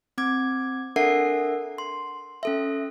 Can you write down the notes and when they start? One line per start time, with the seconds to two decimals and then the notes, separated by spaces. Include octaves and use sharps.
0.18 C4 D6 G#6
0.96 D4 A4 A#4 E5 F#5 C7
1.78 C6
2.43 C#4 A4 E5